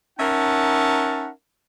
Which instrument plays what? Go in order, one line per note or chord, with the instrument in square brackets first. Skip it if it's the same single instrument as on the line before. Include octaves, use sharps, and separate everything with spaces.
[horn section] C#4 D#4 A#4 E5 F#5 A5